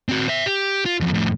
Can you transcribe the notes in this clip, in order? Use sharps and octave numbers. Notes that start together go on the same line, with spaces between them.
C4 F#4
C5 E5
G4
F4
E2 F3
F2 A2